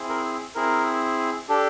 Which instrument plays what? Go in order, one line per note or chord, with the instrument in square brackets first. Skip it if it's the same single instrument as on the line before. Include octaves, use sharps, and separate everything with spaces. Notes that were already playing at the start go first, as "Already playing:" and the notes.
Already playing: [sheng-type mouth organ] C4 E4 G#4
A#4
C4 E4 G#4 A#4
D4 G4 A4